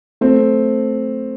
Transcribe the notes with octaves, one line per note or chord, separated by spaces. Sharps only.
A3 C4